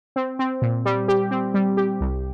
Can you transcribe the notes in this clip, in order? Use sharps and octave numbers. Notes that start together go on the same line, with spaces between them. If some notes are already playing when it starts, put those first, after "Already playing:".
C4
C4
A#2
G3
G4
C4
G3
G4
C2